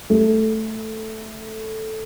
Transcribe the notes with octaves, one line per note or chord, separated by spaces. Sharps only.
A3